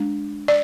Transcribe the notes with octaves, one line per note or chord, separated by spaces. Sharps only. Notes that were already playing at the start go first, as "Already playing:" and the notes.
Already playing: G#3 D4
D5